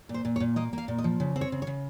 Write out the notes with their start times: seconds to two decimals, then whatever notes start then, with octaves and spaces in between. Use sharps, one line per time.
0.09 A#2
0.14 C5
0.25 A#2
0.36 C#5
0.40 A#2
0.56 A#3 D#5
0.73 A#3 F5
0.88 A#2
0.98 D#5
1.04 F3
1.20 C#3
1.36 C4
1.41 C#5
1.52 C#3
1.62 C#5
1.67 C#3